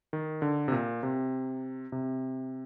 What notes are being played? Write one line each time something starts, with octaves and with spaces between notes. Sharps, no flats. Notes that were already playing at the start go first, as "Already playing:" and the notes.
D#3
D3
C3
A#2
C3
C3